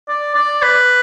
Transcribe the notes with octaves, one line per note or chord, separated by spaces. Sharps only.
D5
D5
B4